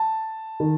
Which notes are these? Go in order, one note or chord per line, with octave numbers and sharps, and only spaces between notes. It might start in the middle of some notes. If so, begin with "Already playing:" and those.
Already playing: A5
D#3